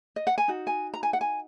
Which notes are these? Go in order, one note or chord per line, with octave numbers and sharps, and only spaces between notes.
D#5
F#5
G#5
D#4 F#4
G#5
A#5
G#5
F#5
G#5